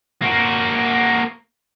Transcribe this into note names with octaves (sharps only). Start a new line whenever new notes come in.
A#3 F#4